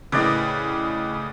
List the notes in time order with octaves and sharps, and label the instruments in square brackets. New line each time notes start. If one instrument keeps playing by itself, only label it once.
[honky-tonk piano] A2 C#3 [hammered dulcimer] B4 D5 D#5